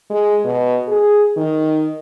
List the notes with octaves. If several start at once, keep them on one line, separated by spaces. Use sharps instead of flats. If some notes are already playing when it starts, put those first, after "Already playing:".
G#3
B2
G#4
D#3